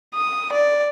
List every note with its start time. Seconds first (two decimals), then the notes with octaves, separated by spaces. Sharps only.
0.14 D#6
0.53 D5